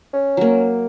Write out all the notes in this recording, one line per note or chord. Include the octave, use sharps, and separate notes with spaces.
C#4
F#3 A#3